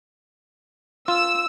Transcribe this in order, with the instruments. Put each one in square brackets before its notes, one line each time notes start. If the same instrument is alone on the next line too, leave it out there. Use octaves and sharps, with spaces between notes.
[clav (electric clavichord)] F4 [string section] E6